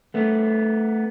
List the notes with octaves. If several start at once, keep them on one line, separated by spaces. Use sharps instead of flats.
A3 B3